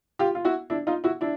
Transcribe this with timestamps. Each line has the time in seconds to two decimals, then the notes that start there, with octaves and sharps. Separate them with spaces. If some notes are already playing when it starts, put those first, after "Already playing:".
0.19 F4 G4
0.35 F4
0.45 E4 F#4
0.70 D4 E4
0.87 D#4 F4
1.04 E4 F#4
1.21 D4 E4